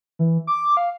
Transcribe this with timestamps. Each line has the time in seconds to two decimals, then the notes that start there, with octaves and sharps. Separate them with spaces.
0.19 E3
0.47 D6
0.77 F5